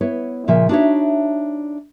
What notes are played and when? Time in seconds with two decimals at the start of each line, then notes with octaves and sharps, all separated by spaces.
0.01 B3 E4 C#5
0.48 A#2 C#3 F3 E5
0.69 D4 D#4 F#4 A4 C#5 E5